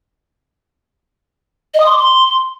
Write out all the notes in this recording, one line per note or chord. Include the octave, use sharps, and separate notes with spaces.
D#5
D#6
C6
D6
C6